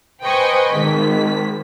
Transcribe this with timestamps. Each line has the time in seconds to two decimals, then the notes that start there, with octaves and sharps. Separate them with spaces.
0.23 B4 C5 D#5 G5 G#5 C#6
0.71 G#1 D#3 B6